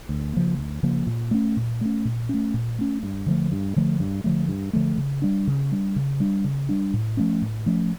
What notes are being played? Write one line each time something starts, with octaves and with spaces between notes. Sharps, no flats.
D2
C#3 F3 A#3
D2
C#3 F3 A#3
A#2
A3 C#4
A#2
A3 C#4
A#2
A3 C#4
A#2
A3 C#4
G2
D3 F3 A3
G2
D3 F3 A3
G2
D3 F3 A3
G2
D3 F3 A3
C#3
G3 D4
C#3
G3 D4
C#3
G3 D4
C#3
G3 D4
A2
F3 A3 C#4
A2
F3 A3 C#4